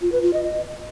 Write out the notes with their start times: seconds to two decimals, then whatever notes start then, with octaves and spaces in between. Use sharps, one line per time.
0.02 F4
0.12 B4
0.23 F4
0.33 D#5
0.44 D#5